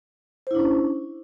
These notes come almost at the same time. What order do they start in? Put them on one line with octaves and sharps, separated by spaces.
C5 E4 D4 C#4